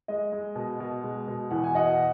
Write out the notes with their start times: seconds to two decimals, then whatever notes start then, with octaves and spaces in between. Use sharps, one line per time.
0.08 G#3 D#5
0.32 G#3
0.55 B2
0.80 B2
1.03 G#3
1.28 B2
1.51 E2 F#5
1.64 G#5
1.75 B2 D#5 F#5